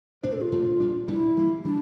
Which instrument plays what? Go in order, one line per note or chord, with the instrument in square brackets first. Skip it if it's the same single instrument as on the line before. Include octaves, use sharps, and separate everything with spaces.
[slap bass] A#2 A3 D4 [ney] C5
[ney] A4
F4
[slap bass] A#2 A3 D4
A#2 G3 D4
[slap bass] A#2 G3 D4 [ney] E4
[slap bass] E3 G3 A#3
[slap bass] E3 G3 [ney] D4